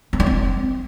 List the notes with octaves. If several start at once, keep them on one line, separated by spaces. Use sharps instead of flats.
C4
D4
C4